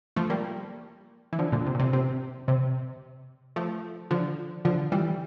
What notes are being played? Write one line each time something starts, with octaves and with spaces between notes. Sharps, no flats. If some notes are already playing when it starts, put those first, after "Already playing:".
F3 A3
G3 A#3
E3
D3 F3
A#2 D3
C3
A#2
C3
C3
C3
F3 A3
D3 F3
D3 F3
E3 G3